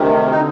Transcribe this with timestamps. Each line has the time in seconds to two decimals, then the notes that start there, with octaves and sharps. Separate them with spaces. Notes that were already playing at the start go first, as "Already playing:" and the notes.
Already playing: D2 C3 D#3
0.31 D3 D#4